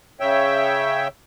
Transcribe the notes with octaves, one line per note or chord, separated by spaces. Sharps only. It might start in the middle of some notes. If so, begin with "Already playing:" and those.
C#3 C#5 E5 G5